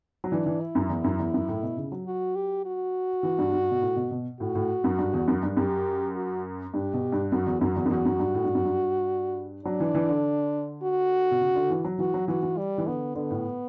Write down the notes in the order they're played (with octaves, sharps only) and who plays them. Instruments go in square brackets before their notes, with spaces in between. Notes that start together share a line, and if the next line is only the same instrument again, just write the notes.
[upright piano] F#3
[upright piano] E3 [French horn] D4
[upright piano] E3
[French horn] E4
[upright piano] F#2
E2
F#2
E2
F#2
A2
B2
C#3
F#3
[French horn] F#4
G4
F#4
[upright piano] E3
G2
G2
B2
A2
B2
B2
[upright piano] A2 [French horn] F#4
[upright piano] A2
F#2
G2
E2
F#2
G2
[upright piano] F#2 [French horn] G4
[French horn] F#4
[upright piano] G2 [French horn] G4
[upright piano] B2
G2
[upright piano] F#2 [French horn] F#4
[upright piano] E2
[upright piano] F#2 [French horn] F#4
[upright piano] E2
F#2
[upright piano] E2 [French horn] F#4
[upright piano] F#2
G2
A2
G2
F#2
G2
[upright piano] F#3 [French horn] D4
[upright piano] E3
E3
D3
[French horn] F#4
[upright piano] B2
C#3
D3
E3
F#3
[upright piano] E3 [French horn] F#4
[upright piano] F#3
[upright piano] E3 [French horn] F#4
[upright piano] E3
[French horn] G3
[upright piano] E3
[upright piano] D3 [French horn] B3
[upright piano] D3 [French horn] B3
[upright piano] A2